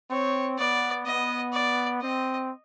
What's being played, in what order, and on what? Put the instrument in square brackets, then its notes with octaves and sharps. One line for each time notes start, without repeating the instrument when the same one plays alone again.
[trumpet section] C4 [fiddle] C#5
[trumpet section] B3 [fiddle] D5
[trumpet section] B3 [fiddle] D#5
[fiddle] D5
[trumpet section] C4 [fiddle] D#5